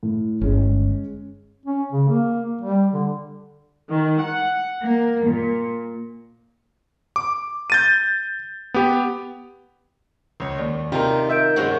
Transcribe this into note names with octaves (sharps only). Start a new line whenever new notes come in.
A2
G1 G#3 C#4
C#4
C#3
A#3
G3
D3
D#3
F#5
A#3
A#2
D6
G6 A6 D#7
B3 G4
C#2 C#5
D#2 D5
C3 D#3 D#4 F4 G4 A#4
A#4 E5 G6 D7
G2 C3 D#3 G#3 C#4 F#4